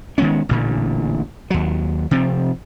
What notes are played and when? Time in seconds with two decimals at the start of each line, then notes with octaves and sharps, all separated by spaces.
0.18 D#3 G#3 B3 C#4
0.49 A1 A#2 D3
1.50 D#2 F#3
2.11 C3 F3 C4